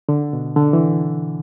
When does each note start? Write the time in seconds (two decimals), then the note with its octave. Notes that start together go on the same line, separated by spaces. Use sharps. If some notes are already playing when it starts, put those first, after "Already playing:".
0.09 D3
0.33 B2
0.56 D3
0.73 E3